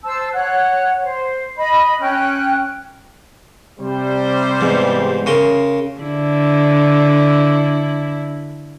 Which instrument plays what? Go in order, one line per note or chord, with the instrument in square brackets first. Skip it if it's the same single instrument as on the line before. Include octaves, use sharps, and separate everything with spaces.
[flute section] C5 A5 E6
C#5 F#5 F#6
C5
D#5 B5
C#4 G5 F#6
[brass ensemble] C3 G3 C5
[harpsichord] E2 G#2
C#3 A#4 C6
[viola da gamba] D3 E4